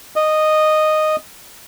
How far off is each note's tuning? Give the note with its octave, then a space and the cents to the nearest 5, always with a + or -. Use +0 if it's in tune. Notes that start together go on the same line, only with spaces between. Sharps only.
D#5 -10